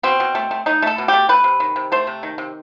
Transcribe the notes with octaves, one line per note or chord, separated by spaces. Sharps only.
B2 C4
B2
A3
A3
A3 D#4
A3 A4
B2
G4
A3
A3 B4
C3
D#3
C3
A3 C5
C3
D#3
C3